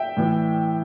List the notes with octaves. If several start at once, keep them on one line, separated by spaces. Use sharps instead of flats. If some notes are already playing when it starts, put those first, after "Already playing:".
Already playing: E5 G5
A2 E3